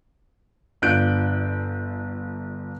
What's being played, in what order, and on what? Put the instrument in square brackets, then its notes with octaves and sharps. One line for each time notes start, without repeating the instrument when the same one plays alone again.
[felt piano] G1 D4 F4 F#6 G6 D7